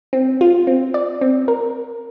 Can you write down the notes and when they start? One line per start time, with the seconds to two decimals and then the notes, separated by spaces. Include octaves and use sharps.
0.13 C4
0.41 F4
0.67 C4
0.94 D5
1.21 C4
1.48 A#4